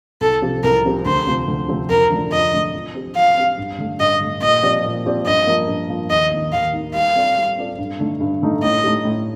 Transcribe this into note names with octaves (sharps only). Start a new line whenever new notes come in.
C2 A4
C3 F3 C4 G4
C2 A#4
C3 F3 C4 G4
D2 C5
C3 F3 A3 C4
D2
C3 F3 A3 C4
F2 A#4
D3 F3 A3 D4
F2 D#5
D3 F3 A3 D4
F3
C4 G4
F3 F5
C4 G4
G2
D3 A3
G2 D#5
D3 A3
A#2 D#5
F3 C4 G4 D5
A#2
F3 C4 G4 D5
G2 D#5
F3 A#3
G2
F3 A#3
D#2 D#5
D#3 A#3 D#4
D#2 F5
D#3 A#3 D#4
G3 F5
C4 F4 A4 D5
G3
C4 F4 A4 D5
G2
D3 A3 D#4
G2
D3 A3 D#4
A2 D#5
A3 D#4 G4
A2